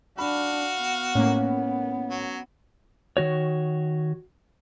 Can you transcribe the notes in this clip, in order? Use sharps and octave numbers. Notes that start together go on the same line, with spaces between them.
D4 F#4 F5 B5
B3
A2 A#3 C#4
F#3
D#3 F#4 C#5